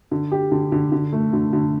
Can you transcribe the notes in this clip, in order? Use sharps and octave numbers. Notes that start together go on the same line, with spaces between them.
D3
G4
D3
D3
D3
A3
D3
D3